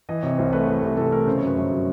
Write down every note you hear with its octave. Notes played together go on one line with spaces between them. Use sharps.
E3 D#5
C3 C#5
C2 C5
A3 B4
E3 A4
C3 G4
C2 A4
A3 A#4
C#3 C5
C#5
F#2 B4
G1 C5
F#3 C#5